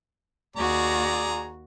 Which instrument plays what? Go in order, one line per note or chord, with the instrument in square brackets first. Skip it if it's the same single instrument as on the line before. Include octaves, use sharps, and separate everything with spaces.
[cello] D#2 F#4 [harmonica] G#4 D5 A#5